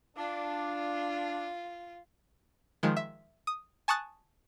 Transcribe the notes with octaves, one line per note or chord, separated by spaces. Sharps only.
D4 F4
D#3 F3 G#3
E5
D#6
G#5 A5 C#6 D#6 F#6 A6